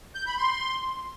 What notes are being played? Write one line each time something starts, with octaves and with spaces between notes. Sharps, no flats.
G6
B5
C6